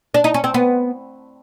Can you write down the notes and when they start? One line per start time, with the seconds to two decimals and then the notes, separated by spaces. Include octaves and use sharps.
0.14 D4
0.24 D#4
0.34 C#4
0.44 C4
0.54 B3